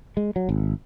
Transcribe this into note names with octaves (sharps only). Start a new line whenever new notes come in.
G#3
F#3
G#1